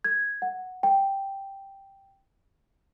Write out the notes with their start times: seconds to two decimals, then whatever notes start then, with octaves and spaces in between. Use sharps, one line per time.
0.04 G#6
0.42 F#5
0.83 G5